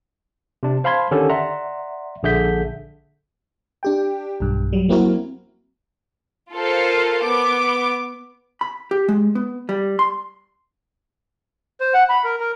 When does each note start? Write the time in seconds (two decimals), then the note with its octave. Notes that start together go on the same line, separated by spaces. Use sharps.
0.63 C3 D4
0.84 C5 F5 A5 B5 C6 G#6
1.11 D3 D#3 C#4 D4 G4 A4
1.29 D5 E5 F#5 A#5 C6
2.23 A#1 D3 G#4 E5 G6 B6
3.83 D4 G4 G5
4.40 B1 G2
4.73 F#3 G3
4.89 F#3 A#3 C4 E4 F#4 A#4
6.53 F4 A4 A#4 C5 F5
7.23 B3 D6
8.61 B5
8.91 G4
9.08 G#3
9.35 B3
9.69 G3
9.99 C6
11.80 C5
11.94 F#5
12.09 B5
12.24 A#4
12.40 A#4